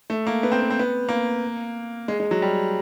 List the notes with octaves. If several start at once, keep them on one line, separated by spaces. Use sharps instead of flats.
A3
A#3
B3
C4
B3
C4
B3
A#3
G#3
G#3
F#3
G3